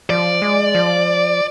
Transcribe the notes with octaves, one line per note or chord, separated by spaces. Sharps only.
F3 D5
G#3
F3